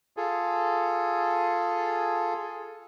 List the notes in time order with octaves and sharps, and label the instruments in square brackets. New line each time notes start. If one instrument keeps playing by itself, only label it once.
[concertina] F4 G#4 A4